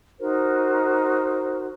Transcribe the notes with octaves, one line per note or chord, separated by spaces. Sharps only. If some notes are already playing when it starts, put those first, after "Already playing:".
D#4 F#4 A#4 C5